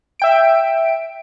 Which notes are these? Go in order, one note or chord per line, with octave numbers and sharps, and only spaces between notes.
E5 G5 D7